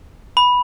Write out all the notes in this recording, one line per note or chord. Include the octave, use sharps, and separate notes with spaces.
B5